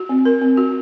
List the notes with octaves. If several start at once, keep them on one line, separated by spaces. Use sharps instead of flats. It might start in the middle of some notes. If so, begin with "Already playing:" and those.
Already playing: F#4
C4
A#4
C4
F#4